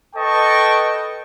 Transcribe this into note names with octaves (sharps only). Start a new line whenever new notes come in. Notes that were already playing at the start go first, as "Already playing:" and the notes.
A4 B4 D#5 G5 A5 C#6